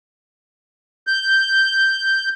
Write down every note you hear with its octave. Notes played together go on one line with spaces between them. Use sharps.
G6